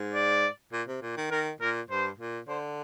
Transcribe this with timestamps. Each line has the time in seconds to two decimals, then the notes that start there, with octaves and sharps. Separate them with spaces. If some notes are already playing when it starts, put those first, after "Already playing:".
Already playing: G#2
0.14 D5
0.73 A#2
0.88 C3
1.02 A#2
1.17 D#3
1.31 D#3 A#4
1.61 A#2 A#4
1.90 G2 C5
2.19 A#2
2.48 D3 C5